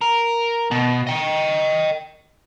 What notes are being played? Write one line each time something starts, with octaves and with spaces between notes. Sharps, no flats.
A#4
B2
D#5 G5